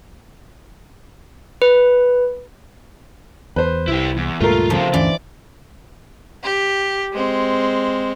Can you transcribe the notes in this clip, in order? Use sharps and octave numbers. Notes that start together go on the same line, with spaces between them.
B4
E2 B4 C5
C2 E4 G4
E2
C#2 G2 A#2 A3 F4 A#4
C#3 F3 C4
D2 G2 E3 C#4 D5
G4
G#3 C4